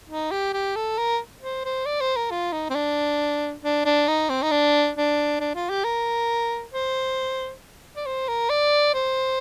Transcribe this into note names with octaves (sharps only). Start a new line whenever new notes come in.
D#4
G4
G4
A4
A#4
C5
C5
D5
C5
A#4
F4
D#4
C4
D4
D4
D4
D#4
C4
D#4
D4
D4
D4
F4
G4
A#4
C5
D5
C5
A#4
D5
C5